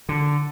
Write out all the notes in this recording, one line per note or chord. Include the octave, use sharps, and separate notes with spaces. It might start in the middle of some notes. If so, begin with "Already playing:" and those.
D3